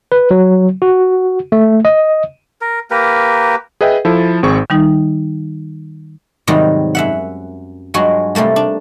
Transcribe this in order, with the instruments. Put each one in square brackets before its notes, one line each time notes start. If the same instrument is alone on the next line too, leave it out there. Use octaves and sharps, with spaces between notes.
[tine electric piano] B4
F#3
F#4
A3
D#5
[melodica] A#4
A#3 G4 A#4 B4
[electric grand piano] G#4 B4 D#5 E5 G5
F3 E4 A4
G#1 C4 G#4 C#6
[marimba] D#3 G3 D#4
[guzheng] G#2 C3 D#3 F#3 G3
F#2 E5 F#5
G2 F#3 G#3 F4 F#4
C3 G3 A3 A#3
D4